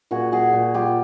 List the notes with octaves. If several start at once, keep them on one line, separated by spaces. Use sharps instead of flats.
A#2 F#4 G#4
F#4 G#4
A#2
F4 G4